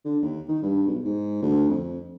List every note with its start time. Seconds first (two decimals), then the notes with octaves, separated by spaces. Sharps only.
0.05 D3
0.22 D#2
0.49 D#3
0.63 G2
0.87 B1
1.05 G#2
1.43 D2
1.69 F2